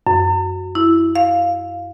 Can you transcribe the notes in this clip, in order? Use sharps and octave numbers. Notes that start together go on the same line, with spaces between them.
F#2
E4
F5